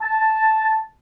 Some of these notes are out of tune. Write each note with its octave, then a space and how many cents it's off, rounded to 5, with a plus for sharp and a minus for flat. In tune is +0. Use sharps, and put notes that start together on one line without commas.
A5 -5